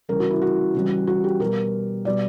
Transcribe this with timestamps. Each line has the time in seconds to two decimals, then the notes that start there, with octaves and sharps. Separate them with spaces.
0.09 C#3 E3 G3 A#4
0.20 F#4
0.31 E4
0.42 F#4
0.74 C#3 E3 G3
1.07 F#4
1.24 G4
1.40 B2 G3 A#4
2.05 B2 G3 D5